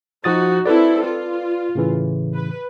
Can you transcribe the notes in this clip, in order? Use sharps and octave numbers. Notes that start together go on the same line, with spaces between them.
F3 D#4 F#4 D#6 A6
C4 E4 A4 B4 D5
F4
A2 C#3 E3
B4